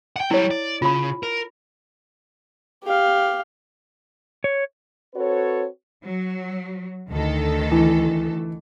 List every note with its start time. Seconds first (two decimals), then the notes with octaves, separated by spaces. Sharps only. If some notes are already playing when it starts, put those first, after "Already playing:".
0.16 F#5 G5
0.31 F#3 G3 E4 C#5
0.51 D5
0.82 C#3 F4 B5
1.23 A#4
2.84 G4 F5
4.44 C#5
5.14 C4 F#4 A4 B4 C#5
6.06 F#3
7.10 D2 D#3 A4
7.72 E3